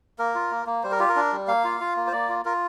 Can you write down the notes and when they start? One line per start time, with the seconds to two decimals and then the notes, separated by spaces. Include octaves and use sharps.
0.19 A#3 A#4
0.35 F4
0.51 A#3
0.66 A#3
0.83 G3 C5
0.91 A#4
1.00 F4 G4
1.09 A#4
1.16 D4
1.32 G3
1.48 A#3 F5
1.64 F4
1.81 F4
1.97 A#3
2.07 C5
2.12 A#3 D5
2.29 F4
2.45 F4 A#4